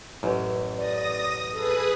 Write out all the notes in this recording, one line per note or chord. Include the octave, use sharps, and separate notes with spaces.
A1 F#2
D5 D#6 A#6
G#4 A4 B4 D#6